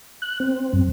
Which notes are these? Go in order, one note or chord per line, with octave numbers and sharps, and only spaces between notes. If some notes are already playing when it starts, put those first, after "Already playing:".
F#6
C4
F#2